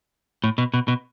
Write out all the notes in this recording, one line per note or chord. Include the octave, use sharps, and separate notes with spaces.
A2
B2
B2
B2